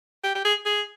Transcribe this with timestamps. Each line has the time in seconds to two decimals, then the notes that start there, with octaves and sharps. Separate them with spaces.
0.24 G4
0.35 G4
0.45 G#4
0.66 G#4